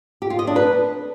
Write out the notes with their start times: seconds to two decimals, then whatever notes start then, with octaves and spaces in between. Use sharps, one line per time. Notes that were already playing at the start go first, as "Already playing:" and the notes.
0.22 G4
0.30 F4
0.39 D#5
0.47 D4
0.56 B4